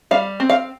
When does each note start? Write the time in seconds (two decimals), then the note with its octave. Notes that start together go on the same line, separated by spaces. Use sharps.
0.11 G3 F5
0.40 C4
0.50 F5